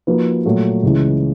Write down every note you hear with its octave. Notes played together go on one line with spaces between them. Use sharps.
F3 A#3 D#4 F#4 B4
A#2 F#3 A3
C#2 C#3 E3